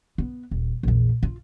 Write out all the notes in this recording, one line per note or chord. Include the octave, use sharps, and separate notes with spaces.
B3
D#1
A#1 E2
F4